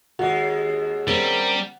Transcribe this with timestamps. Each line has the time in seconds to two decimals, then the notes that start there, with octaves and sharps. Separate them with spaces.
0.19 D#2 G#3 F#4
1.08 G3 C4 C#4 A#4